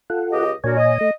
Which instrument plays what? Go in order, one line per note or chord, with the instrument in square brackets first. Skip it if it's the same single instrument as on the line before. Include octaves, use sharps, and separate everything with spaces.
[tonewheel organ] F4 A4 F#5
[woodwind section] C#2 G4 D#5
[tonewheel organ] A#2 C#5 G#5 [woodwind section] D4 F#4 A#4
[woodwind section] D#5
[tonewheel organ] A3